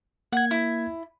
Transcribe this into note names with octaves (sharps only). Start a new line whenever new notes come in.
A#3 F#5 G#6
E4